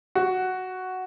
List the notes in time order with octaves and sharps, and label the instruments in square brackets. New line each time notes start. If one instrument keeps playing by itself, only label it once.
[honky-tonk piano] F#4